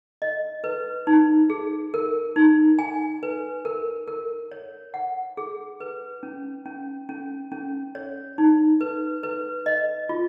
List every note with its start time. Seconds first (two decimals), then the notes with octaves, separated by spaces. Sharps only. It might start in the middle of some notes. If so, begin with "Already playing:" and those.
0.22 D#5
0.64 B4
1.07 D#4
1.50 G#4
1.94 A#4
2.36 D#4
2.79 G#5
3.23 B4
3.65 A#4
4.08 A#4
4.51 C#5
4.94 F#5
5.37 G#4
5.80 B4
6.23 C#4
6.66 C#4
7.09 C#4
7.52 C#4
7.95 C#5
8.38 D#4
8.81 B4
9.23 B4
9.66 D#5
10.09 F4